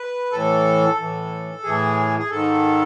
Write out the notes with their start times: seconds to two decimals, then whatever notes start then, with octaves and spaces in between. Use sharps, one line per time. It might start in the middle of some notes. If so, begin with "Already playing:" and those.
Already playing: B4
0.32 A2 E3 A4
0.99 A2 E3
1.64 A2 E3 G#4
2.19 G#4
2.30 G#2 D#3 A4